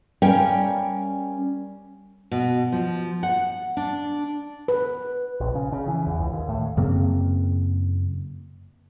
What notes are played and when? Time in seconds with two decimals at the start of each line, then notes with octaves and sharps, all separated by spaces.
0.22 G3 C#4 A#4 F5 G5
2.31 B2
2.72 F3
3.23 F#5
3.77 D4
4.68 B4
5.40 A#1
5.55 C#3
5.72 C#3
5.88 E3
6.07 E2
6.19 C#2
6.31 D#2
6.49 A2
6.77 F#2 C#3 A#3 C4